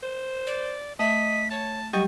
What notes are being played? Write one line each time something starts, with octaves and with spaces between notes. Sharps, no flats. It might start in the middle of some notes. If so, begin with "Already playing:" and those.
C5
D5
A3 D#5 E5 B6
C#5 A5
F#3 G3 G4 D#5 C#6